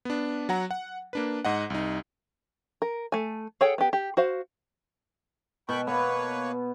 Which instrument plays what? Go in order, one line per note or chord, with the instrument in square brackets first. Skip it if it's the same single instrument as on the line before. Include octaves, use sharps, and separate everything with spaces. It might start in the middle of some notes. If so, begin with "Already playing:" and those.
[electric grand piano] B3 D4
F#3 F#5 A#5
F#5
A#3 D4 B4
G#2 D#5 F#5
C2 D#4
[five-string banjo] A#4
A3 G#5
G#4 A4 C#5 F#5 G5
B3 G4
G4
F#4 C5 F5
[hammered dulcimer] B2 [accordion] G5 B5 C#6
[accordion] A#3 B4 C#5 [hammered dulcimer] B3